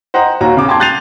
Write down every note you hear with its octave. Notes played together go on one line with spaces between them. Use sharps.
C5 D#5 F#5 G5 A#5
D#2 A#2 F#4 C#5 A#5
C#3 D6
G5 A5 C6 D6 G#6
F#6 G6 A6 C7 D#7 F7